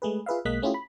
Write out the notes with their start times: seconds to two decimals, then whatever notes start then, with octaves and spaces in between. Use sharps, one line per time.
0.02 G#3 A3 G#4 B4
0.26 F4 G#4 B4 E5 F5
0.45 B1 G#3 A#3 D#5 F#6 B6
0.62 A3 C#4 E4 F4 G4 G#4
0.74 B5